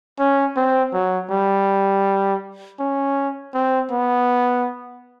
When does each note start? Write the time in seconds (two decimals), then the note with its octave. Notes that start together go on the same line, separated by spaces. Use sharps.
0.19 C#4
0.57 C4
0.93 F#3
1.31 G3
2.80 C#4
3.54 C4
3.91 B3